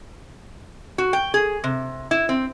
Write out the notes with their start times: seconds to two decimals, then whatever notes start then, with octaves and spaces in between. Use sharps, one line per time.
0.98 F#4
1.13 G5
1.34 G#4
1.64 C3
2.11 E4
2.29 C4